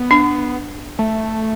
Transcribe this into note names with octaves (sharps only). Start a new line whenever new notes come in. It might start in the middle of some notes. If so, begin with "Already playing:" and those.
Already playing: B3
D4
A3